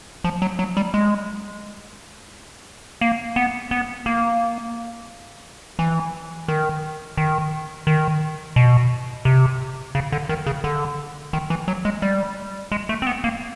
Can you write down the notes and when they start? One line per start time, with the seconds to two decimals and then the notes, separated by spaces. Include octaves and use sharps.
0.24 F3
0.42 F#3
0.59 F#3
0.77 G3
0.94 G#3
3.01 A#3
3.36 B3
3.71 B3
4.06 A#3
5.79 E3
6.48 D#3
7.17 D#3
7.87 D#3
8.56 B2
9.25 C3
9.95 C#3
10.12 D3
10.29 D#3
10.46 C#3
10.64 D3
11.33 D#3
11.50 E3
11.68 F#3
11.85 G#3
12.02 G3
12.72 G#3
12.89 A3
13.02 C4
13.07 B3
13.24 A#3